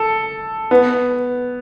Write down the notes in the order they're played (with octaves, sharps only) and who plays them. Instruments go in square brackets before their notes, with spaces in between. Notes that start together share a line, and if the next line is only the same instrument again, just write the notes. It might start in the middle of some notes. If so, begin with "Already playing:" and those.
Already playing: [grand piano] A4
B3